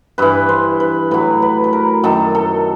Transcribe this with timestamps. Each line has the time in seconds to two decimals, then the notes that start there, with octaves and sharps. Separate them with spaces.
0.18 G2 E3 B4
0.49 C5
0.80 B4
1.11 A2 F#3 B4
1.42 B4
1.64 B4
1.73 A#4
2.03 F#2 D#3 F#3 A4
2.35 A4